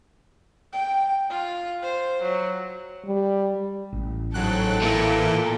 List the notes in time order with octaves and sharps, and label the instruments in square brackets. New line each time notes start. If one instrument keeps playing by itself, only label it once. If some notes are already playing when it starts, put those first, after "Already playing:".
[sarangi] G5
F4
C5
F#3
[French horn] G3
[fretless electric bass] A1
[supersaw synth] G#2 F#3 F#6 [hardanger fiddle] A4 G5
[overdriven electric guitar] A#2 [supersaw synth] E3 A#3 E4